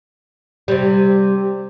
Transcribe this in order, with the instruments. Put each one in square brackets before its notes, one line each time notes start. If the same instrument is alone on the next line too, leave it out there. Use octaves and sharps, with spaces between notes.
[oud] C3 G3